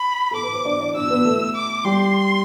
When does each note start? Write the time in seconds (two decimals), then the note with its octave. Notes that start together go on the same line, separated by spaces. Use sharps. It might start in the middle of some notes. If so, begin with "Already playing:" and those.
Already playing: B5
0.31 A4 D6
0.43 B4
0.54 C5
0.65 D4 D5
0.80 D4 D5
0.95 D4 D5 E6
1.10 B3 B4
1.25 A3 A4
1.56 D6
1.85 G3 G4 C6